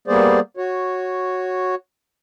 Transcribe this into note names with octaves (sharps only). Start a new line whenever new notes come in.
G3 A#3 B3 G#4 C5 D5
F#4 C#5